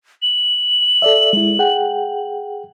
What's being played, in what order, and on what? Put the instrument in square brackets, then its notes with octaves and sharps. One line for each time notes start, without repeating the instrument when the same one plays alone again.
[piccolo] F#7
[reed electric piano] A4 D5 E5
G#3 E4
G#4 F#5 G5